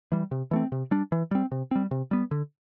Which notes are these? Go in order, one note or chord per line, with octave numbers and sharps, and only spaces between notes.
E3 G3
C3
E3 A3 C4
C3
G3 D4
E3
G3 C4
C3
G3 C4
C3
G3 B3
D3